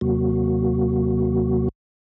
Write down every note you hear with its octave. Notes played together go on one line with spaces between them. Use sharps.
D#2 C3 F#3 A#3 F#4